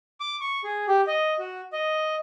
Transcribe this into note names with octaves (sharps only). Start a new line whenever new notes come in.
D6
C#6
G#4
G4
D#5
F#4
D#5